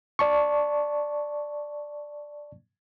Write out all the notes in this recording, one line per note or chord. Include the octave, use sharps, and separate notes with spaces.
D5 A5 C#6